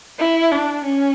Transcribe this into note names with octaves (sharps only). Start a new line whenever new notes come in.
E4
D4
C#4